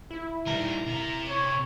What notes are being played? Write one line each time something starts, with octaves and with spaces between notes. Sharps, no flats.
E4
G3 D#4 A#4
C3 A#5
C#5